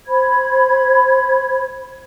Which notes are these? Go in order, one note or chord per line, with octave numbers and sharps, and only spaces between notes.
C5 B5 G#6